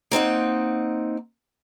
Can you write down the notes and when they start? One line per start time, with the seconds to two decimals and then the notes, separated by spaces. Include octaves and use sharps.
0.11 A#3 C4 D#4 F#5